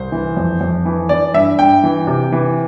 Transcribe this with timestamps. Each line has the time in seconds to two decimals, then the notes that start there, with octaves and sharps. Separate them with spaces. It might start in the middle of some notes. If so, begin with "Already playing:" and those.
Already playing: C2 C5
0.12 E3
0.37 F2
0.61 F2
0.85 E3
1.09 E3 D5
1.34 G2 E5
1.59 G2 G5
1.84 E3
2.07 C3
2.32 E3